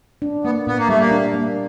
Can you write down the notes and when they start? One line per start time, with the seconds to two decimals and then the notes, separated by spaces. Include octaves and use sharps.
0.22 D4
0.44 A#3 B3
0.67 A#2 B3
0.78 A#3
0.88 G3 A3
0.99 A#3
1.11 D4
1.34 A#3